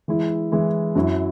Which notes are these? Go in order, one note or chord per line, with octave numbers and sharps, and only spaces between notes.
E3 G#3 E4
E3 G#3 E4
F#2 F#3 C#4 E4